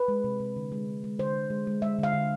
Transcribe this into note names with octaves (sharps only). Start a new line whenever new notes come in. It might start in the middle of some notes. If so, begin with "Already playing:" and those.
Already playing: B4
G#3
C3
C3
D3
G#3
D3
G#3
D3 C5
G#3
G#3
G#3
G#3 E5
D3 F5
D3